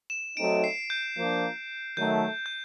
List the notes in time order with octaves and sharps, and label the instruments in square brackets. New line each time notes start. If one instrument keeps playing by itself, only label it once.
[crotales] E7
[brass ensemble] F#3 A3 C4 D#4 [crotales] D7
[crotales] C7
G6
[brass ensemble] F3 A#3 D4
[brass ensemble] D#3 F#3 A3 [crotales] G6
[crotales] G6